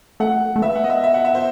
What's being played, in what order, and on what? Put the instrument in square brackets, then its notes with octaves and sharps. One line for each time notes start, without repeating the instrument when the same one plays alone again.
[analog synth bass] A3 [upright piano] F#5
[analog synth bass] A3
[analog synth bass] B3 [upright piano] E5
[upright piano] F#5
D#5
E5
E5
F#5
E5
C5